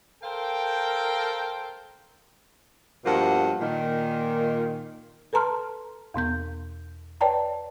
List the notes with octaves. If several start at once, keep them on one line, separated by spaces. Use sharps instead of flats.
A4 A#4 C5 F5 G5
G2 B2 F3 A#3 A4 F#5
A#2 D#3
A4 B4 A5 A#5 C6 F6
E2 B2 B3 G6
B4 C#5 D5 G5 A5 A#5